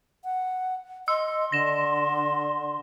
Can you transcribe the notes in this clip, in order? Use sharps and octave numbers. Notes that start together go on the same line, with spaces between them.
F#5
D#5 C6 E6
D3 A#6 E7